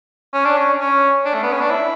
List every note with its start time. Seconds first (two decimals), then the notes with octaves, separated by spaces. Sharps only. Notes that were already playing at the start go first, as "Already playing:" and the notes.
0.34 C#4
0.46 D4
0.57 C#4
0.79 C#4
1.25 D4
1.34 A3
1.43 B3
1.52 C#4
1.61 D4
1.70 E4